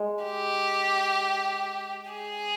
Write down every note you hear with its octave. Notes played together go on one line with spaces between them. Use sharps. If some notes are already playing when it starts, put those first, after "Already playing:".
Already playing: G#3
G4
G#4